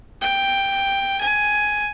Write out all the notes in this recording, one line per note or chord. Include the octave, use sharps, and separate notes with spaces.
G5
G#5